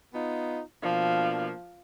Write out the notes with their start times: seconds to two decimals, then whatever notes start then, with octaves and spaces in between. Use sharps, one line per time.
0.13 B3 D#4 F4
0.82 B2 F3 A#3 D4